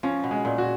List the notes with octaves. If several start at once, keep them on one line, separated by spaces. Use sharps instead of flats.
F3 C#4
B2
G#3
A#2
F#4